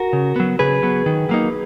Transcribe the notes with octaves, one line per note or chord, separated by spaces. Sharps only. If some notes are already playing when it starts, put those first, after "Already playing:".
Already playing: F#4 A#4
C#3
F#3 B3
C#3 G#4 B4
F#3 B3
D#3
F#3 A#3 D#4